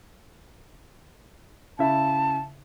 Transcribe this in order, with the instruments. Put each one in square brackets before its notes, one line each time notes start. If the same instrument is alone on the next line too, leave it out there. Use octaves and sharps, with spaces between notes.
[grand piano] C#3 E4 E5 [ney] A5